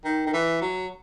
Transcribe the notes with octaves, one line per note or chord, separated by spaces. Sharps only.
D#3
D#3
E3
F#3